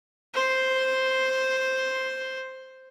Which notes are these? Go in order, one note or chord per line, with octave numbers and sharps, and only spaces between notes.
C5 C6